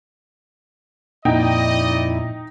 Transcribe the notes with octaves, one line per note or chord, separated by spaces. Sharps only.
F2 A#2 D#4 E4 D5 D#5 G5